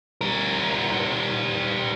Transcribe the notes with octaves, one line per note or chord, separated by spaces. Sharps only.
G3 A#4